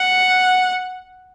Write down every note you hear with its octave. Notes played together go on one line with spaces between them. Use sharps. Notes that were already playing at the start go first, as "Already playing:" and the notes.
Already playing: F#5